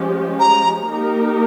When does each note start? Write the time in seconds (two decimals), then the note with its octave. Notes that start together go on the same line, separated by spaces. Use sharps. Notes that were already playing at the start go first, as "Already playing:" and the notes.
Already playing: F3 G#3 C#4 G4
0.40 A#5
0.88 A#3 D#4 G4 A#4